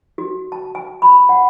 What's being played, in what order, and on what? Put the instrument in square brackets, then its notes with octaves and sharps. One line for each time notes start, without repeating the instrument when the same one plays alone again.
[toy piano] F#4
A5
G#5
B5
F#5